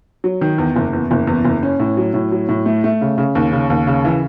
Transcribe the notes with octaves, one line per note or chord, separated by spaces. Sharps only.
F#3
D#3
E2
F#1
E2
F#1
E2
F#1
C#4
A2
F#3
A2
F#3
A2
A3
A3
C#3
C#3
D#2
C#3
D#2
C#3
E3